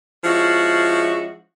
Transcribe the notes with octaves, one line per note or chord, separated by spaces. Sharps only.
F3 G#3 C#4 E4 F#4